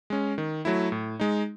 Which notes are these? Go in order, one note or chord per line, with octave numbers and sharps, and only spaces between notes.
G#3 C#4
D#3
F#3 A3 E4
A2
G#3 D#4